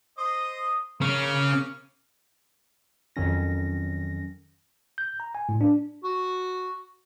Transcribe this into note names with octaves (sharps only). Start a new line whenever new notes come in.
C5 D#5 D#6
C#3 A#3 C#4 C#6 F6
F2 D#3 F#3 C#4 A#6
G6
A#5
G#5
A2
D4
F#4